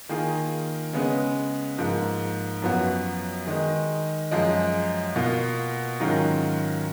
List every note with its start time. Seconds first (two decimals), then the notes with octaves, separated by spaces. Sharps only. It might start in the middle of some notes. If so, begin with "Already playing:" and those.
0.09 D#3 A#3 F4 G#4
0.93 C#3 G#3 B3
1.78 G#2 F3 A#3
2.62 F#2 F3 B3 F#4
3.47 D#3 G#3 D#4
4.31 F#2 F3 G#3
5.15 B2 A#3 F4
6.00 G#2 D#3 F#3 C#4 F4